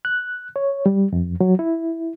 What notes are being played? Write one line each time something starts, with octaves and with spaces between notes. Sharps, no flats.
F#6
C#5
G3
F2
F#3
E4